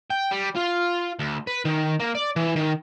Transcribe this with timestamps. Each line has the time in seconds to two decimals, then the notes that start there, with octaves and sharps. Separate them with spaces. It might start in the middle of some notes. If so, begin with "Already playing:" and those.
0.10 G5
0.32 G3
0.57 F4
1.19 D2
1.47 B4
1.65 D#3
2.00 A#3
2.15 D5
2.36 E3
2.56 D#3